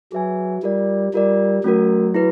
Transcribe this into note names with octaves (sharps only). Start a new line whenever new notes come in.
F#3 G#4 B4 E5 G#5
G3 F4 A#4 D5
G3 F4 A#4 D5
F#3 A3 C#4 F#4 A#4
E4 G#4 B4